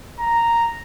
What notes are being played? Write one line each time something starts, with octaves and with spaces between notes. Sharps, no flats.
A#5